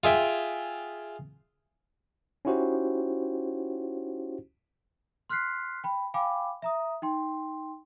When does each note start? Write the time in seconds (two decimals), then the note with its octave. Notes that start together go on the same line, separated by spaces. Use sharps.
0.04 F4 G#4 E5 G5
2.45 C#4 D#4 E4 F#4 G4 C5
5.29 C6 F6 F#6 B6 C7
5.84 G5 B5
6.14 F5 G5 G#5 B5 D6
6.62 E5 A#5 D#6
7.02 D#4 G5 C6